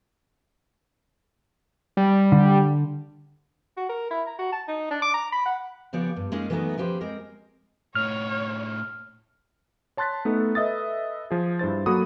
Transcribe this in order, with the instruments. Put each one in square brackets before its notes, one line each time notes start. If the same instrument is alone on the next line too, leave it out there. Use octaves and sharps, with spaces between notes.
[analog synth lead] G3
[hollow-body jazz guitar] D3
[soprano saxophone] F#4
A#4
E4
A#5
F#4
A5
D#4
D4
D6
A#5
B5
F#5
[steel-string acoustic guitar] C#3 F3 B3 G4 C#5 D5
G2
G#3 A#3 C#4 D#4 F4
E3 F#3 A3 B3 D#4 A#4
F3 C#4 G4 B4 C5
G#3 C4 A#4
[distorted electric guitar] A2 D#4 [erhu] C#5 [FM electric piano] F6
[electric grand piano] C#5 A5 C6 F#6 A6 B6
A3 B3 D#4 A4
A4 B4 D#5 E5 D#6 A6
F3 G#4
G2 E4 C5 A6
F#3 A#3 F#4 A4 B5 D#6